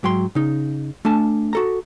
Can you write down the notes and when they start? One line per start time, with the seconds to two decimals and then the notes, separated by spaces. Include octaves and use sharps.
0.03 G#2 F#3 G5 C6
0.35 C#3 D#4
1.05 A3 D4 A4 G#5 A5
1.53 F#4 A4 A#5